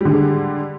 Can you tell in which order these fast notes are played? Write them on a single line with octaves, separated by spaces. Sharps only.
G3 D3 G#3